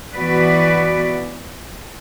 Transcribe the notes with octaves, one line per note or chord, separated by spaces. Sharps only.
E3 B3 F#4 B4 D5